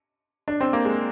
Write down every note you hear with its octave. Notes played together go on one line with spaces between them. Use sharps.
D4
C4
A#3
G#3